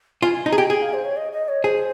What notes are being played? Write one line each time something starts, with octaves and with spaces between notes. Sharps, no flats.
F4 G#5
G#5
D#4 A#5
G#4
G4 G#5
G#4 G#5
F5
C5
C#5
D#5
D#5
C#5
G#4 C5